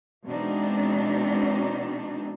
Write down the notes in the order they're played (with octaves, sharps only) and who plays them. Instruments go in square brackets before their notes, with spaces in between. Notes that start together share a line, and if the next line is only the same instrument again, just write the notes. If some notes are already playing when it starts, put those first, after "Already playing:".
[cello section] B2 E3 G#3 C4 D4 D#4